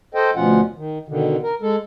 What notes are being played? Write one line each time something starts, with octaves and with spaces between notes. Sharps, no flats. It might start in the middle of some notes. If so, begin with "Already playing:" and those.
A4 C5 D#5 G5
D2 B2 F3 C#4 F4 F#5
D#3
B2 D3 D#3
A#4
G#3 A4